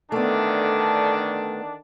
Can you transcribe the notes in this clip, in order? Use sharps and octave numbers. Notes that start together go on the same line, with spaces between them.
D3 D#3 A3 B3 D4